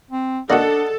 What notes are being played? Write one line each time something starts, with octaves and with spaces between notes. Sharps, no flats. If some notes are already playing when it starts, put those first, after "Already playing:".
C4
A#3 D4 F#4 A4 D5 D#5 F#5